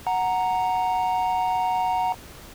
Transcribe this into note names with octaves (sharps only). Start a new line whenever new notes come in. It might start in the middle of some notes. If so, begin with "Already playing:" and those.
F#5 A#5